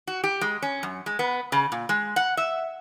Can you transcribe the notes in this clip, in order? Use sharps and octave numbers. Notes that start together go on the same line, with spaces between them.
F#4
G4
G#3
C#4
F#2
G#3
B3
C#3
A#2
G#3
F#5
E5